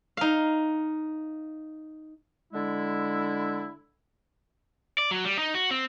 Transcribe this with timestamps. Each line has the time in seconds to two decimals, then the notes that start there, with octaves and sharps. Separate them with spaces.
0.17 D#4 F5
2.53 D3 G#3 E4
4.98 D5
5.11 F#3
5.25 G3
5.39 D#4
5.55 F#4
5.71 C4